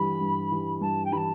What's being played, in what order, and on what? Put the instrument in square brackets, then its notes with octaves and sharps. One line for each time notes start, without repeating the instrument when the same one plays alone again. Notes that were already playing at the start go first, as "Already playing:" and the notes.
Already playing: [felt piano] G2 E3 G3 [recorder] B5
[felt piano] G2
E3 G3
[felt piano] G2 [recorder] A5
[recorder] G5
[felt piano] E3 G3 [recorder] A5 B5